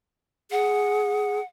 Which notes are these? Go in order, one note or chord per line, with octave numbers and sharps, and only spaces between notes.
G#4 F#5